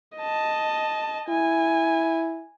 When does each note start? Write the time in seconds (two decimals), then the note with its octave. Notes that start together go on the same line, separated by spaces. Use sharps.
0.17 D#5 A5
1.29 E4 G#5